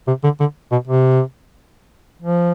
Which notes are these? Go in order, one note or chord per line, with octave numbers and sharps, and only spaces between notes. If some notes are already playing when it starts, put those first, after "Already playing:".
C3
D3
D3
B2
C3
F3